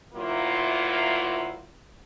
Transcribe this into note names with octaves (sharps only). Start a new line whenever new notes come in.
D2 F#3 A#3 E4 F4